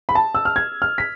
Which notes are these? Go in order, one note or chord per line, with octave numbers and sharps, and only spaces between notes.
B5
A5
E6
F6
G#6
F6
B6